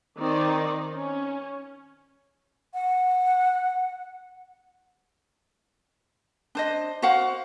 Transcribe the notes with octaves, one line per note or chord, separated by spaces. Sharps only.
D#3 C4 D#4 D5
C#4
F#5
D4 C5 D#5
F#4 C5 F5 F#5